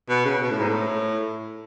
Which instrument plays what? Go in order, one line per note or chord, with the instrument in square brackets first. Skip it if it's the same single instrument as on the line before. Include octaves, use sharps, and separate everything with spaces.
[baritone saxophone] B2
C#3
B2
A2
G#2
A2